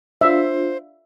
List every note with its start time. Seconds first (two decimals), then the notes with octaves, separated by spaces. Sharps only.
0.21 D4 F4 C5 E5